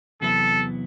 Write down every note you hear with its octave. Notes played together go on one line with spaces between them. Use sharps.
E2 C3 F#3 B3 E4 A4